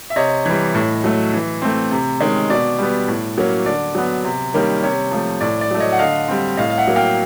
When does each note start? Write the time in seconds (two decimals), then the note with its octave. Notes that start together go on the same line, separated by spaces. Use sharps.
0.10 E5
0.16 C3 C#5 D#5
0.46 E3 G3
0.75 A2
1.04 F#3 A3
1.34 E3
1.62 A3 C4
1.91 C3
2.21 D#3 G#3 C#4
2.50 B2 D5
2.78 G3 B3
3.08 A2
3.38 F#3 A#3 C#4
3.66 D3 D5
3.95 F#3 B3
4.25 C3
4.54 D#3 G3 A#3 C#4
4.83 C3 C#5
5.11 F3 A3
5.41 A2 D5
5.61 D5
5.71 F#3 A3
5.80 C#5 D#5
5.92 F#5
5.99 D3 D#5 F5
6.28 G3 C4
6.57 A2 D#5 F5
6.70 F5
6.78 E5 F#5
6.87 F#3 A#3
6.96 F5 G5